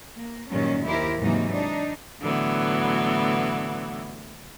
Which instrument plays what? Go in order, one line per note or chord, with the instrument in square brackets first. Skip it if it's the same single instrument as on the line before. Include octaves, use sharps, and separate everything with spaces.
[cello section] A#3
G2 A#2 D#3 F#3 C#4
D#2 E4 G4 A#4 C5
G#2 C3 E3 F#3 A#3 D#4
D4 D#4
[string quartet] A2 D3 E3 F#3 B3